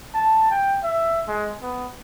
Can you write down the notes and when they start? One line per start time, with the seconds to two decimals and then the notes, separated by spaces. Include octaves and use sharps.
0.14 A5
0.51 G5
0.84 E5
1.28 G#3
1.62 B3